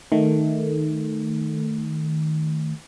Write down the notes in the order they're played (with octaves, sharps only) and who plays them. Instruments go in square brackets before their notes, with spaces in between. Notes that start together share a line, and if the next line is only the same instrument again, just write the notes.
[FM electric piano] D#3 A3